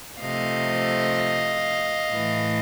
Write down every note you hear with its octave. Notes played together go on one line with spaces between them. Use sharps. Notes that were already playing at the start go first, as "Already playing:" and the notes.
C3 F3 A3 D#5 F5
A2 E3 A3